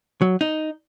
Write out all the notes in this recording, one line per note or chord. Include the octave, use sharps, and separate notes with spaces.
F#3
D#4